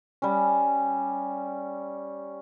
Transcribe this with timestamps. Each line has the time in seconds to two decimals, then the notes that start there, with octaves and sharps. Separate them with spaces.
0.22 G3 C#4